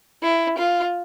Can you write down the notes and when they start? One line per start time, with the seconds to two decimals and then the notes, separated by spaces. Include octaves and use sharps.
0.23 E4
0.58 F4